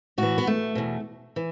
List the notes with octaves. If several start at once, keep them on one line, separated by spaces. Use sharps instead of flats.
A2 E3 F#4
B3
A3
E2 B2
E3